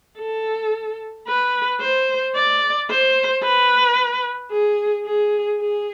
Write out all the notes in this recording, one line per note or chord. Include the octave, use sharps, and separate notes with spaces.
A4
B4
C5
D5
C5
B4
G#4
G#4
G#4